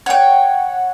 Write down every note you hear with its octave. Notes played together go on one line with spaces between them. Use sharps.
C#5 F#5 G5